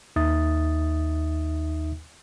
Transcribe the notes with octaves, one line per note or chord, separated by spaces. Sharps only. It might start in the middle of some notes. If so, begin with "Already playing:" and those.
D#2 D#4 E5 D#6 A6